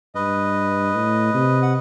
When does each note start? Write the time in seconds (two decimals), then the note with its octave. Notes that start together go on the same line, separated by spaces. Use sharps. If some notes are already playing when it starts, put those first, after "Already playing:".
0.15 G2 B4 D#5
0.95 A2
1.34 C3
1.62 F#5